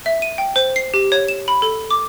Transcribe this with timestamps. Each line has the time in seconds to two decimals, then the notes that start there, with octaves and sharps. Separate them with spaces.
0.06 E5
0.22 D#7
0.38 G5
0.56 C5
0.76 C7
0.94 G4
1.12 C#5
1.28 E7
1.48 B5
1.62 A4
1.91 D6